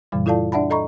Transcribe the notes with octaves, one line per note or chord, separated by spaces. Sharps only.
F#2 A#2 C#3 E3 G3
E4 F4 A4 D5 F5 A5
D4 D5 E5 F#5 A5 B5
A4 D#5 A#5 B5 C#6